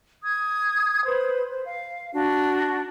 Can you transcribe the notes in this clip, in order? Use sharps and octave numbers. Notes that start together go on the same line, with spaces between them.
D#6 G#6
B4 C5
C5
F5
D4 F#4